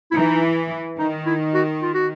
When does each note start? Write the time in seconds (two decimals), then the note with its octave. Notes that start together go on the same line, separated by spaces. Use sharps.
0.11 E4
0.16 E3 D#4
0.99 D#3 D#4
1.26 E4
1.54 F#4
1.82 F4
1.94 F#4